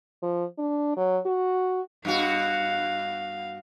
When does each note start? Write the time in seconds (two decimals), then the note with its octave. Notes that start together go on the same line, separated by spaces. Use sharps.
0.23 F3
0.58 D4
0.97 F#3
1.26 F#4
2.05 G2 B3 F#4 F5